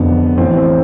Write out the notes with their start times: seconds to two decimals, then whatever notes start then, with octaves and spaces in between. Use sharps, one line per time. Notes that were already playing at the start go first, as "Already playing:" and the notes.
Already playing: F1 F2 D3 F3 B3
0.37 A1 A2 E3 C4
0.57 C4